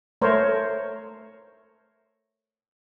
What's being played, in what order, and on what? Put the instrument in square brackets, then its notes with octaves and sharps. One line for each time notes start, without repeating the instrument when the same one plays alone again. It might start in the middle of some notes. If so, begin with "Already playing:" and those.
[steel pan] A3 A#4 C5 C#5